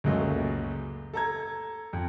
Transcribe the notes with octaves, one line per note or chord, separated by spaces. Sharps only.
C#2 F#2 A#2 F#3 G#3 A3
A4 A#5 G#6
F2